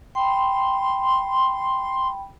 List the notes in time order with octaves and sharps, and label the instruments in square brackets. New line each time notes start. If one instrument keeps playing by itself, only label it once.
[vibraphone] G5 B5 [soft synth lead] C6